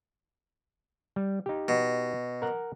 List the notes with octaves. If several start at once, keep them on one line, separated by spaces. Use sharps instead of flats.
G3
D#4 G4
B2
A#4 F#5